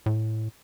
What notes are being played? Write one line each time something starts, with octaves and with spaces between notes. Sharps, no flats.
A2